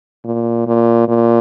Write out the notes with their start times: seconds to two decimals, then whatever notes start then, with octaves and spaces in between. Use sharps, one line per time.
0.25 A#2
0.67 A#2
1.08 A#2